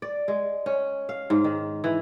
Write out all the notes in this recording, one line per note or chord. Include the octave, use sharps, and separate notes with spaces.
D5
G#3
C#4
F5
G#2
D#3
E3